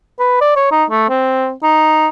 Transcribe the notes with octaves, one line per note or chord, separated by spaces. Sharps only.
B4
D5
C#5
D#4
A3
C4
D#4